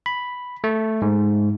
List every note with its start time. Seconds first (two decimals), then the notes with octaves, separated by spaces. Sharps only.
0.06 B5
0.64 A3
1.02 G#2